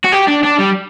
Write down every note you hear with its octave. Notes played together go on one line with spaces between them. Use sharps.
F#4
G4
D4
D4
G3